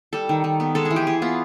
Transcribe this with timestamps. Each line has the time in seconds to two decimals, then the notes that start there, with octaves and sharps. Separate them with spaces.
0.13 G3 A4
0.29 D#3
0.44 D#3
0.60 B3
0.75 G#3 A4
0.85 G#4
0.91 E3
0.96 G4
1.07 E3 G#4
1.22 B3 F4